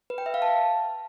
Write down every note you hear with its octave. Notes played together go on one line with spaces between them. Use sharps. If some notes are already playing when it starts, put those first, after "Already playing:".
B4
G5
E5
F5
A5